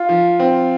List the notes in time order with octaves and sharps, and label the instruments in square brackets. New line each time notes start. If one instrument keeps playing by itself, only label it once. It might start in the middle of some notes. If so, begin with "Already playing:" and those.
Already playing: [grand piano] F4
[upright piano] F3
C4